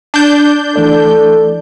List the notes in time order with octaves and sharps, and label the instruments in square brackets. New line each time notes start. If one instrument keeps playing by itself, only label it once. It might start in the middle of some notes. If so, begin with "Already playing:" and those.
[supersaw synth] D4 G6
[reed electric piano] E3 A3 D5 [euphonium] A4